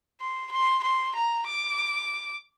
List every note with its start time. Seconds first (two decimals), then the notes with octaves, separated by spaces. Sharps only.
0.21 C6
0.51 C6
0.83 C6
1.15 A#5
1.47 D6